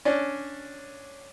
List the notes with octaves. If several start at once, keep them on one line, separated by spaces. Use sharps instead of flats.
C#4 D4